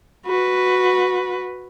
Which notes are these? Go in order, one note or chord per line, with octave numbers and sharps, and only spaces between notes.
F#4 B4